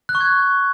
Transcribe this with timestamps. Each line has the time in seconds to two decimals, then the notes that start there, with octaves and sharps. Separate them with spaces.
0.09 F#6
0.15 C#6
0.20 G#6